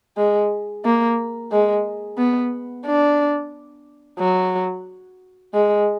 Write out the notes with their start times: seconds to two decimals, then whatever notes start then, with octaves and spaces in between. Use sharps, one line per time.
0.17 G#3
0.85 A#3
1.52 G#3
2.18 B3
2.86 D4
4.19 F#3
5.54 G#3